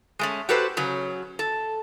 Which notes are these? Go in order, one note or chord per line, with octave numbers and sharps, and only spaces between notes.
G#3 A3 C#4
F#4 G4 A4 B4 C5
C#3 F#3 C#4
A4